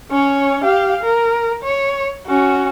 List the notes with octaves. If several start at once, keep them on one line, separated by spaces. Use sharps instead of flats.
C#4 C#5
G4 F5
A#4
C#5
C#4 F#4